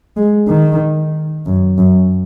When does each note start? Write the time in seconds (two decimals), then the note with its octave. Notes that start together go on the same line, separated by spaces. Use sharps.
0.16 G#3
0.48 D#3
1.46 F#2
1.78 F#2